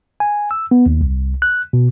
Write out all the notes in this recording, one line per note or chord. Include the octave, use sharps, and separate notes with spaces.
G#5
E6
B3
D#2
C2
F#6
B2